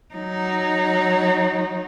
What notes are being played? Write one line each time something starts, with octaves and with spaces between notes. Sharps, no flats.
F#3 D#4